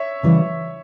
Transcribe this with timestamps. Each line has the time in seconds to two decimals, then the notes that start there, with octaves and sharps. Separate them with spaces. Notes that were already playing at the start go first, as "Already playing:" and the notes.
Already playing: C#5 E5
0.23 C#3 E3 G3